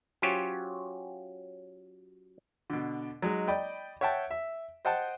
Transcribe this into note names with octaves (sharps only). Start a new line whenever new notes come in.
F#3 C#4 F4 G4 C5 C#5
B2 D3
F#3 G#3 D#4
D5 D#5 G5 B5
C#5 E5 F#5 G5 A5
E5
C5 D#5 F#5 G5 A5